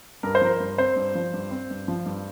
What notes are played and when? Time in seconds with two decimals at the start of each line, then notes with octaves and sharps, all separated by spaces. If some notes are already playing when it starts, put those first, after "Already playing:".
0.23 G2 A#4
0.35 C5
0.41 F3 A#4
0.60 G2
0.78 C4 C5
0.96 G2
1.15 F3
1.33 G2
1.51 C4
1.70 G2
1.88 F3
2.06 G2